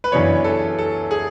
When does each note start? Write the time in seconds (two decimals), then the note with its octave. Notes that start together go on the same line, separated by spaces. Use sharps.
0.04 B4
0.12 F#2 C#3 E3 B3 D4 C#5
0.44 A4
0.78 A4
1.11 G#4